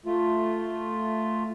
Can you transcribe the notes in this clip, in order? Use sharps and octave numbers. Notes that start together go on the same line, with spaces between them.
A3 F4